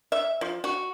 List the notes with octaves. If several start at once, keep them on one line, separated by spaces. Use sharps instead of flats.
E5
F3
F#4